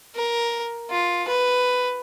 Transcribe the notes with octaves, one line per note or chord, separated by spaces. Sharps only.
A#4
F4
B4